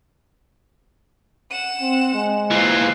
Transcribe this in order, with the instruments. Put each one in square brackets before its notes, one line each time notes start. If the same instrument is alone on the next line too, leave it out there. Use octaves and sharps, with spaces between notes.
[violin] F#5 E7
[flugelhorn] C4
G#3
[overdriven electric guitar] D#2 E3 [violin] F4 C5